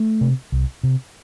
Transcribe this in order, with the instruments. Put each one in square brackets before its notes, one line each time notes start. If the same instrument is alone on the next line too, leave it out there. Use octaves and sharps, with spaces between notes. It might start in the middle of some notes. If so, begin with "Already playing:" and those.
Already playing: [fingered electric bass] A3
C3
C2
C3